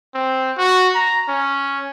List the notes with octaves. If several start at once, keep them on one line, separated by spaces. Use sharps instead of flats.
C4
F#4
A#5
C#4